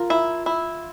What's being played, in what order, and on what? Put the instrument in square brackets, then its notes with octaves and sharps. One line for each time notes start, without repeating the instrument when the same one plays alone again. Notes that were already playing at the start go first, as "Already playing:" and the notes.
Already playing: [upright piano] F4 [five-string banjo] A#4
[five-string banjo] E4
E4